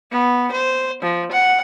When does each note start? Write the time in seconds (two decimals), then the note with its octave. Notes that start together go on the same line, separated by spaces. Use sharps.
0.11 B3
0.52 C5
1.03 F3
1.32 F#5